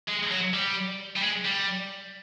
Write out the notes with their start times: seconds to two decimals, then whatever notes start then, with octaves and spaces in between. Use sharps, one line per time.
0.09 G#3
0.31 F#3
0.54 G3
1.16 G3
1.22 G#3
1.45 G3